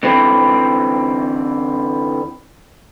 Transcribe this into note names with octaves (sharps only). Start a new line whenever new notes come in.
D3 E3 C4